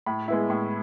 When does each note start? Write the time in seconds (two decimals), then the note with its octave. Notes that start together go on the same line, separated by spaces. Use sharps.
0.06 A2 B5
0.28 G#3 B3 E4
0.50 A2